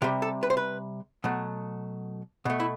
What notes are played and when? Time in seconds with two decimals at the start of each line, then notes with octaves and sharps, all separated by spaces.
0.02 C3 G3 G4
0.22 A4
0.43 B4
0.50 C5
0.57 B4
1.24 B2 F#3 A3
2.45 B2 A3
2.60 E4